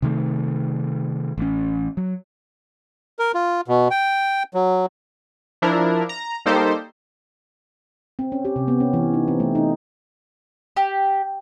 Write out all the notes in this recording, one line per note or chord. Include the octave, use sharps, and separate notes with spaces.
C3 D#3 A3
A1 C#4
F#3
A#4
F4
B2
G5
F#3
F3 D4 E4 A#4
A#5
G3 A#3 D#4 G4 A4 C5
C4
C#4
G4
C3
B3
C#4
E3
D#4
C4
A3
D#4
G4